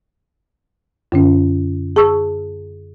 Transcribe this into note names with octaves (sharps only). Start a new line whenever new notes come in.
F#2 D3 C#4
G#4 A5 C#6 E6